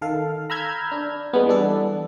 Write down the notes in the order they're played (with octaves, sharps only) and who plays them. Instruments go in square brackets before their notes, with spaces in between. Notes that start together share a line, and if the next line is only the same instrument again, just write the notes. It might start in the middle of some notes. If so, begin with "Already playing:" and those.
[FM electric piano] D#3 A4 F5
A#5 B5 E6 F6 G6 G#6
D4
G#3 B3
E3 G3 D4 A4